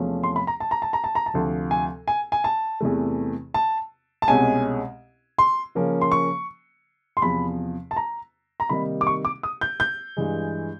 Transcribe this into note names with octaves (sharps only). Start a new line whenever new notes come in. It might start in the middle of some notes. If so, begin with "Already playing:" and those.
Already playing: E2 C3 F3 A3 C#4
C6
B5
A#5
A5
A#5
A5
A#5
A5
A#5
A5
D2 C3 F3
G#5
G#5
G#5
A5
E2 C3 E3 A3
A5
A5
C2 B2 G#3 C#4 G#5
C6
C#3 F3 A#3 C#4
C6
C#6
C6
E2 C3 F3 B5
A5
A#5
A#5
C3 D#3 G3 A#3 D#4 B5
D6
C#6
D6
D#6
G6
G6
G2 E3 G#3